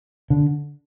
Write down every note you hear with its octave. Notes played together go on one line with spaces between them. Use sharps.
D3